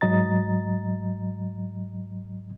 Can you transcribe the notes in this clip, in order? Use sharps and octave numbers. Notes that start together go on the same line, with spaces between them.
G#2 F#3 D#5 A#5 A6